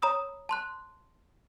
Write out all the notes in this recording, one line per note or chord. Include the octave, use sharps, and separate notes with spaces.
C#5 A#5 B5 D#6 E6
A5 C6 F#6